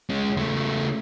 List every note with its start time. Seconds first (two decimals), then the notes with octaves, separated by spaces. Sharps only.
0.10 G#3 C#4
0.38 C#3 A3